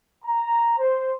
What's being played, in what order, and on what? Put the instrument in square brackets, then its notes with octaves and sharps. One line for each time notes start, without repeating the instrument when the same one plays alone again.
[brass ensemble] A#5
C5